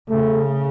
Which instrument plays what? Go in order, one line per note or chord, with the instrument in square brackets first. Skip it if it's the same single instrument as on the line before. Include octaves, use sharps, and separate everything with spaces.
[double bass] C#3 [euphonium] A3